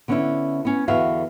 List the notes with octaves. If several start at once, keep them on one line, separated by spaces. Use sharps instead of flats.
D3 B3 C#4 D4 E4
B3 C#4
E2 D3 B3 F#4 E5 F5